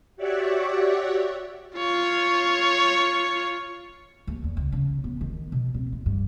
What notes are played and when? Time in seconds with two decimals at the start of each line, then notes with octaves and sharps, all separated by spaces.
0.16 F#4 G4 C#5 D5 E5 F#5
1.77 F4 C#5
4.27 D#2
4.44 E2
4.57 C#2
4.72 C#3
5.04 B3
5.21 D#3
5.52 B2
5.74 C4
5.92 D#2
6.06 G2